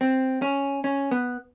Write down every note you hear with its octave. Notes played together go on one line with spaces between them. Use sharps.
C4
C#4
C#4
B3